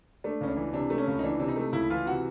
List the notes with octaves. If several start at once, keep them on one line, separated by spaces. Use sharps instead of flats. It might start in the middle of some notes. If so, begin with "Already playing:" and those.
A3 D4
C#2 C#4
D4
E3
C3 D4
A3
C#4
C#2
D#4
E3 D4
C3 D4
D#4
A3
C#2 E4
E3 F4
C3 F#4